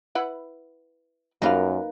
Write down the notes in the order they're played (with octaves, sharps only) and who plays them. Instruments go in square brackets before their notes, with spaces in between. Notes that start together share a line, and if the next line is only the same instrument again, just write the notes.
[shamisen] E4 B4 F#5
[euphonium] F#2 [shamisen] G3 F4 F5 [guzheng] A#3 D#4 B4